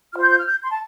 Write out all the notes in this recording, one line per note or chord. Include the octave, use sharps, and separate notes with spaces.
F4 C5 F6 G6
G6
F6
G6
C6
A5